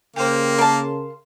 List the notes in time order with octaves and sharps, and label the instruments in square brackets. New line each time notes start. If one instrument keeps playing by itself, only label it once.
[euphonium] C#3 [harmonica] A#3 [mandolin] G4 C5
[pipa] A#4 A5 [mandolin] F5 C6